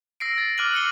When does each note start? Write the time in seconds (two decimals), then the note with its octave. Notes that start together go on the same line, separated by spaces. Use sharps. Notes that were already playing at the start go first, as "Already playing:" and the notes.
0.20 E6 A#6 C7 D7
0.38 A6
0.58 D6 F6 F#6 D#7 F#7
0.74 F6 F#6 C#7 D#7 G7